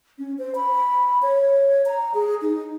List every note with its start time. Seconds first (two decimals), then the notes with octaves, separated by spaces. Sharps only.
0.18 C#4
0.38 C5
0.55 B5
1.22 C#5
1.86 A#5
2.14 G#4
2.42 D#4